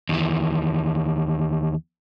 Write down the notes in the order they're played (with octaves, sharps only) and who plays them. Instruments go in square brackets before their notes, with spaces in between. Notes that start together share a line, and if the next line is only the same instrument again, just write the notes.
[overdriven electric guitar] D#2 E3